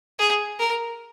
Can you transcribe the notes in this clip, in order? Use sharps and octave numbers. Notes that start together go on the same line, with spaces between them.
G#4
A#4